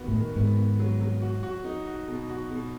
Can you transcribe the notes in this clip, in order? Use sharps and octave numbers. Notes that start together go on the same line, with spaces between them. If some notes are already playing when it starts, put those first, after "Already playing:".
Already playing: D#3 B3 F#4
A2
D#3
G#2 B3
B3
F#3
F#3
F#4
F#4
D#4
F#4
B2
F#4
B2